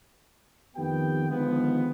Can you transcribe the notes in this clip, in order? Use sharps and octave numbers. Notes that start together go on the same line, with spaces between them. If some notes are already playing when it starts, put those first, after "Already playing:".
F2 D#3 A3 B3 G4 G5
D3 D#3 F3 G#3 B3